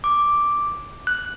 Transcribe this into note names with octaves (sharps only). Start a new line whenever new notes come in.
D6
F#6